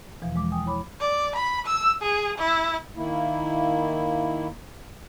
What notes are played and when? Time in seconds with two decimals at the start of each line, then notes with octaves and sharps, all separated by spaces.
0.22 E2 B2 E3 F3
0.36 G#3 D6
0.52 G5 G#5 D#6
0.66 E4 C#5 B5 D6
1.01 D5
1.36 B5
1.67 E6
2.02 G#4
2.38 E4
2.96 D#3 A#3 E4